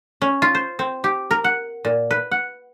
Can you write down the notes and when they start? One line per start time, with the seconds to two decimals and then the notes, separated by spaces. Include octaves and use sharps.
0.22 C#4
0.42 F4
0.55 C5
0.79 C4
1.04 G4
1.31 A#4
1.44 F#5
1.85 A#2
2.11 B4
2.31 F#5